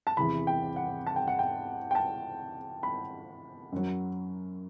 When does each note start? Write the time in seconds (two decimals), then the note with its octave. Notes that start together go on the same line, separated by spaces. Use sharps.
0.07 A5
0.17 E2 C3 E3 B5
0.47 G5
0.76 F#5
1.07 A5
1.16 G5
1.28 F#5
1.39 G5
1.91 G5
1.95 A5
2.83 B5
3.72 F#2 F#3